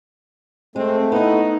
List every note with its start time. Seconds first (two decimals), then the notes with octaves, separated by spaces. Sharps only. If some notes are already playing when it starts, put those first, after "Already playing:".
0.76 G#3 A3 C4
1.12 B3 D#4 E4